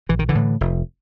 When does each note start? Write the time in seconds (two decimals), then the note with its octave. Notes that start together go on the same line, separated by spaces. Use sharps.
0.09 A#1 E3
0.19 D#3
0.29 D3 E3
0.35 A2
0.61 F1